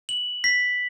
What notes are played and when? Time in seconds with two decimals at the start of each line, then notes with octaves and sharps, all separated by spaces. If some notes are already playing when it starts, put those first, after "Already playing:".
0.09 F#7
0.44 B6